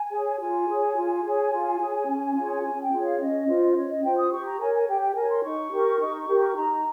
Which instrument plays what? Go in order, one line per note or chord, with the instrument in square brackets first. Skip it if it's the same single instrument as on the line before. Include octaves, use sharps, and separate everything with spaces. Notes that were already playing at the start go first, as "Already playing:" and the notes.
Already playing: [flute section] G#5
G#4 C#5
F4 G#5
G#4 C#5
F4
G#4 C#5
F4
G#4 C#5
C#4
F4 G#4 C#5
C#4 G#5
G5
F4 G#4 C#5
F5
C#4 D#5
F4 C5
C#4 C#5
D#5
F4 C5 G5
D#6
G4 C#6
A#5
A#4 C#5 G#5
G#5
G4 G5
G5
A#4 C#5 G#5
C6
D#4 C#6
G4 A#4
D#4
G4 A#4
D#4 A#5